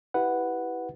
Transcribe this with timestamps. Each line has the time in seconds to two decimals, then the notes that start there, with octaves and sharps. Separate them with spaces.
0.14 E4 G4 B4 F#5